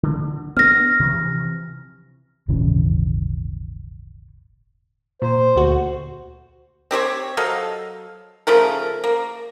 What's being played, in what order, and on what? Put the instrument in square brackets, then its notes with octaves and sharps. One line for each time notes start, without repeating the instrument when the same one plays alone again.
[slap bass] D3
[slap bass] B3 C4 D4 [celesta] F6 A#6
[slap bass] C3 E3 F3
[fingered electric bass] D#1 G#1 C#3 E3
[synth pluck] A#2 [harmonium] C5
[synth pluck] D2 F#4
[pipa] C4 G4 C5 C#5
F#3 A4 D#5 F5
C#3 F3 A3 A#4
A#3